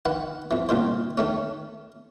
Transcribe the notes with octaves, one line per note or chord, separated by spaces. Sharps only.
D#3 B4 F#5
F2 E3
C2 A#2 D#3 C5
D#3 A3 C#4